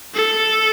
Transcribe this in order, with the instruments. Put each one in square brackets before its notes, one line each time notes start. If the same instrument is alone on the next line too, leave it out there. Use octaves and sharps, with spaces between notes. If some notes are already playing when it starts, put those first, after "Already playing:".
[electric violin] A4